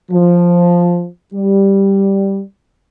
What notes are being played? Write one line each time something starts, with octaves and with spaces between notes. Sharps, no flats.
F3
G3